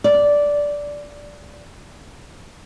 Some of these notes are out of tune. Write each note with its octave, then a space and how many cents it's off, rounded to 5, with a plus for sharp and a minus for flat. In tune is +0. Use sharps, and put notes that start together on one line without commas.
D5 -10